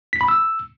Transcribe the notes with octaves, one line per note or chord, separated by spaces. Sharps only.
B6
B5
E6